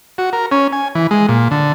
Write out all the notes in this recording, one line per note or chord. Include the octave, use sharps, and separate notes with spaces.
F#4
A#4
C#4
G#5
E3
G#3
A#2
D3